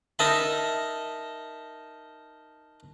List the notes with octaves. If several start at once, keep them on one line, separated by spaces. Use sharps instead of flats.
D#4 A#4 D#5 E5 A5 B5